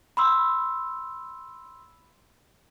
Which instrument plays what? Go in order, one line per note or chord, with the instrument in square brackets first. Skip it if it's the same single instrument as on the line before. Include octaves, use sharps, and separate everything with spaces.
[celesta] B5 C6 E6